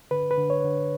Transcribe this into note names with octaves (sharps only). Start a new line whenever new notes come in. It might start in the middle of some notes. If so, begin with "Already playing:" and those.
D3 B4
B4
D3
C#5
D3